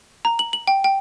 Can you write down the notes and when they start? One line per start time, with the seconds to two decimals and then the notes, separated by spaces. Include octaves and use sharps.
0.25 A#5
0.39 F#7
0.53 F#7
0.67 G5
0.84 G5